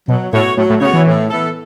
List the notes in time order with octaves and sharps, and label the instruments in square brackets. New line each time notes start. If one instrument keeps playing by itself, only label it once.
[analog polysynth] B2 [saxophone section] F#3
[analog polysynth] A2 [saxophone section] B3 F#4 C#5
[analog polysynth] A2 [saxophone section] F#3
[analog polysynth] A2
[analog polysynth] C#3 [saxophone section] B3 F#4 C#5
[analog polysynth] E3
[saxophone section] A2
E3 B3 A4